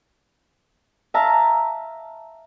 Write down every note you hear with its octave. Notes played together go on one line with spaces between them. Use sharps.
E5 F5 A5 A#5 F6